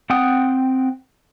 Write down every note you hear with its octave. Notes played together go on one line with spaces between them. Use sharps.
C4 F#5 G5 D#6